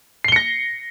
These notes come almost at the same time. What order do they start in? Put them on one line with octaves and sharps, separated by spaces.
C7 G7 C#7 A#6